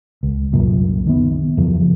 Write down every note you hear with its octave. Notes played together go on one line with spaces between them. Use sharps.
C#2
C2 F#2 A#2
D#3 B3
F2 C#3 E3 F3